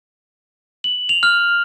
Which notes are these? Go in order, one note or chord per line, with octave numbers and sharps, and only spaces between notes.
F#7
F7
F6